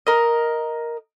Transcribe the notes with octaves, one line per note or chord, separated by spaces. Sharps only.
A#4 D#5